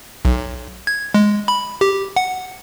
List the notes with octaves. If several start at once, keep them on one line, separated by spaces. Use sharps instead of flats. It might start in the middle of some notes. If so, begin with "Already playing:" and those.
B1
G#6
G#3
B5
G4
F#5